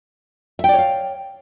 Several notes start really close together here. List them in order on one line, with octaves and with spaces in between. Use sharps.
E5 G5 D5 C#5 F5